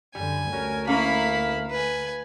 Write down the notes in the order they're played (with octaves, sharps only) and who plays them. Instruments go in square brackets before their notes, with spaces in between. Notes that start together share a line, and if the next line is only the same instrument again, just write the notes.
[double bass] F#2 D3 [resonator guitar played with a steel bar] G3 [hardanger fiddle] G#5
[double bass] D2 A3 [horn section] C#4 F#4 A#4
[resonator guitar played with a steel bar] A#3 C#4 A#4 [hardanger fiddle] E4 B5 [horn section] F5
[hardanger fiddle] B4 G#5